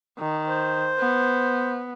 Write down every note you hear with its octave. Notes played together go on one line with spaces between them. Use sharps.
D#3
C5
B3